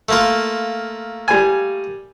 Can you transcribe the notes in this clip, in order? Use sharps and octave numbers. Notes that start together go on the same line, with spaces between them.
A3 A#3 F4
G3 G#5